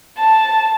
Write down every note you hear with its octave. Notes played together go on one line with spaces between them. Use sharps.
A5